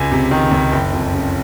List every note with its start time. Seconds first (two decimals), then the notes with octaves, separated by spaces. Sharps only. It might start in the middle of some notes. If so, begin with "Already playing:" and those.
Already playing: C#2 G#5
0.12 C3
0.31 D#3
0.51 C#2
0.72 F#1 G5
0.93 F2
1.14 C#3